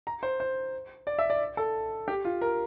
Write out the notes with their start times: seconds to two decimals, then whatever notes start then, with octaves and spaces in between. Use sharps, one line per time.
0.07 A#5
0.23 C5
0.40 C5
1.07 D5
1.19 E5
1.30 D5
1.57 A4
2.08 G4
2.25 F4
2.41 A#4